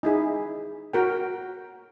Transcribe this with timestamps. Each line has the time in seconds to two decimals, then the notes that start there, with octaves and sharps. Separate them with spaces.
0.03 D#4 E4 G#4
0.93 F#4 A#4 G5